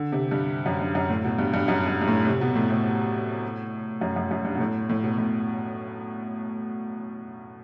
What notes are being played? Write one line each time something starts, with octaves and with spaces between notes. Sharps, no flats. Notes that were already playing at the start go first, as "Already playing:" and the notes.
Already playing: D3
C3
G2
F#2
G2
F#2
A2
B2
G2
G2
F#2
G2
G2
A2
C3
B2
A2
A2
F#2
F#2
F#2
G2
B2
A2
A2
B2
A2